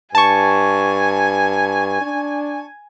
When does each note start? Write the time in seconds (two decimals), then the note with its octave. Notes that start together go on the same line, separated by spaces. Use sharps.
0.15 G2 G#5 A5 C#6
2.01 D4